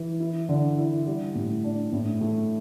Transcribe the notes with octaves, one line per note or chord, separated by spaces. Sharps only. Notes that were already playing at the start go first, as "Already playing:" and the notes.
Already playing: E3
E4
D3
E4
G3
A2
D4
A2
A3